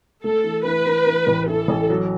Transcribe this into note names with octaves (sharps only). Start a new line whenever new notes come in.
A3 A4
E3
E3 B4
E3
E3
A1
E3 A4
A1
F#3